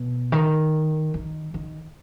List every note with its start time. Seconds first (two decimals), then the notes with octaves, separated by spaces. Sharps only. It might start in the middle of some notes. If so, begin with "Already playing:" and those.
Already playing: B2
0.32 D#3
1.14 D#3
1.54 D#3